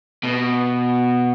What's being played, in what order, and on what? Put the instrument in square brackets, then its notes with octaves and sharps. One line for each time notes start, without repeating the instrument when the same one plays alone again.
[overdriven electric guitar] B2